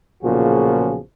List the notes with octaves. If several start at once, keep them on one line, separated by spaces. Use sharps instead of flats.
B1 A#2 C#3 F3 F#4 G#4